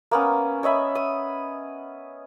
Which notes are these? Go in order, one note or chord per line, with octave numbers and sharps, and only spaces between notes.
A#3 B3 C#4
C#5 D#5 E5 B5
D#6